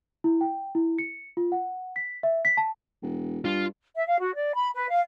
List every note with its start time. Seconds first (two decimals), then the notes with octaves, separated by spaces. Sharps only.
0.24 E4
0.41 G5
0.75 E4
0.98 C#7
1.37 F4
1.52 F#5
1.96 B6
2.23 E5
2.45 B6
2.57 A5
3.02 E1
3.45 G2 F4
3.96 E5
4.08 F5
4.20 F#4
4.36 D5
4.54 B5
4.75 B4
4.90 F5